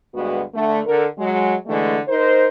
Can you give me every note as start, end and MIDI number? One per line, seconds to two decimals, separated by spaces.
0.14 0.41 38
0.14 0.41 43
0.14 0.41 56
0.14 0.41 59
0.14 0.41 66
0.54 0.81 50
0.54 0.81 57
0.86 1.06 50
0.86 1.06 69
0.86 1.06 70
1.19 1.55 54
1.19 1.55 56
1.67 1.98 50
1.67 1.98 52
1.67 1.98 56
1.67 1.98 57
2.08 2.47 63
2.08 2.47 70
2.08 2.47 72